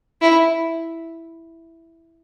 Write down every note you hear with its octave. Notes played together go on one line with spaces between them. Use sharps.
E4